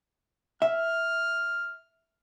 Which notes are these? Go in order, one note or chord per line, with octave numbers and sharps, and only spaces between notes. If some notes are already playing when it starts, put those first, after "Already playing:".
E5 F6